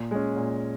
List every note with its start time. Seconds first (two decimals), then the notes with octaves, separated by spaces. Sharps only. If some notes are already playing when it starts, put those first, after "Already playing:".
Already playing: A#2
0.11 G#3 C#4
0.36 A#2